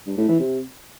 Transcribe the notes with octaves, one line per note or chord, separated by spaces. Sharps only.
G2
A2
E3
C3